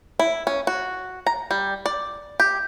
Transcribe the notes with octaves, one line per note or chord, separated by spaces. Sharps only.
E4
C#4
F#4
A#5
G3
D5
G4